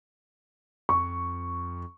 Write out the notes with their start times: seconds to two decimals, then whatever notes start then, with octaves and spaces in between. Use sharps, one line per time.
0.89 F2 C#6